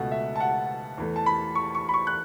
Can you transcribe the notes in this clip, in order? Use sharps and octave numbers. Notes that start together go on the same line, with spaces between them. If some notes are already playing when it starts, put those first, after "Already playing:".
Already playing: C#2 B2 A3 F#5
E5
A5
F#5
E2 E3 A3
A5
B5
C#6
C#6
B5
C#6
F#6